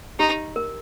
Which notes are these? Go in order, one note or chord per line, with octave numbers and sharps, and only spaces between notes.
D#4 G4
A#4